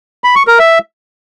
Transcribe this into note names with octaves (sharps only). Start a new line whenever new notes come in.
B5
C#6
A#4
E5